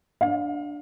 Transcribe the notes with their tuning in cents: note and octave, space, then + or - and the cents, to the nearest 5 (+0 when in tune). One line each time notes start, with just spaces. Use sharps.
D4 +0 F5 +25